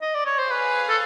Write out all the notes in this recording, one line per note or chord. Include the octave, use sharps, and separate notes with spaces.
D#5
D5
C#5
C5
G#4 B4 C#5 F5
A4